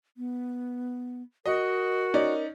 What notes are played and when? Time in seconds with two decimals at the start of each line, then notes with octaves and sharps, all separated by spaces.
0.17 B3
1.46 F#4 A#4 D#5
2.14 C#4 D#4 D5